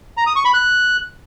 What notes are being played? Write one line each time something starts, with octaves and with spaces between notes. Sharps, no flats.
A#5
D#6
C#6
B5
F#6